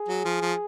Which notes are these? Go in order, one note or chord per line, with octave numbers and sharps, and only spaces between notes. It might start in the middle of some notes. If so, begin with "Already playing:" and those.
Already playing: G#4
F#3
F3
F3